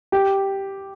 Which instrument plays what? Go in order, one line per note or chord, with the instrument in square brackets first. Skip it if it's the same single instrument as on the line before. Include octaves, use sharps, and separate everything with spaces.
[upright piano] G4